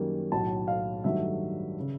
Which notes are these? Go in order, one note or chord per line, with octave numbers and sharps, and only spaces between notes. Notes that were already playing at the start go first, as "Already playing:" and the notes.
Already playing: F#2 D#3 G3 A#3 C#4
B1 A2 F#3 A5
F5
G2 D#3 F#3 A3 E5
C#3